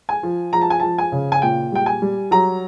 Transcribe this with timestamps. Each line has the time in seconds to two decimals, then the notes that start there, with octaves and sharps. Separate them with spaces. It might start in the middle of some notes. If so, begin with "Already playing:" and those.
0.09 G#5
0.23 F3
0.53 F3 A#5
0.61 A5
0.70 G#5
0.80 F3 A5
0.98 G#5
1.12 C#3
1.32 G#5
1.42 A#2 G5
1.72 G3 G5
1.86 G#5
2.02 G3
2.31 F#3 A#5